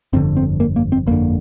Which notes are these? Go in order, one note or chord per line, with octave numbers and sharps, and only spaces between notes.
G1 F2 D3 C4
C4
A#3
A#3
C4
G1 F2 D3 A#3